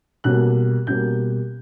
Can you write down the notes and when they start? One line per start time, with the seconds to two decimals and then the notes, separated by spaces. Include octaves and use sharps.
0.24 B1 B2 G3 A#3 F#6
0.87 B1 B2 G3 A#3 G6